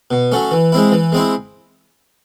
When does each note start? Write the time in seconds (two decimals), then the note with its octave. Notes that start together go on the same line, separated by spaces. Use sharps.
0.11 B2
0.32 F#3 A3 C#4
0.51 E3
0.72 G#3 C4 E4
0.92 E3
1.12 G#3 C4 E4